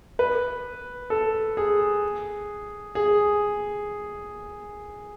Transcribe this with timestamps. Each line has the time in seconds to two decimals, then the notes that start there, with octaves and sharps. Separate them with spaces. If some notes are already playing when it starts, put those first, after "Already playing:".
0.19 B4
1.10 A4
1.57 G#4
2.95 G#4